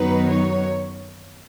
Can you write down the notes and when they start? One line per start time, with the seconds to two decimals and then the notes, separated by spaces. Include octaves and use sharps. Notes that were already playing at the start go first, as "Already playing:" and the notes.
Already playing: F#2 D#3 F#3 B3 D#4 B4
0.30 C#5